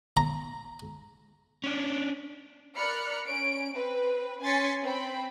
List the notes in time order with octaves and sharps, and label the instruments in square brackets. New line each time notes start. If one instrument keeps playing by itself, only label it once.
[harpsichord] A#5
[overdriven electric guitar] C#4 D4
[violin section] A#4 D5 B5 F6 F#6 C#7
C#4 D7
C4 B4
C#4 G#5 C6 A6 B6 C#7
C4 G5 B5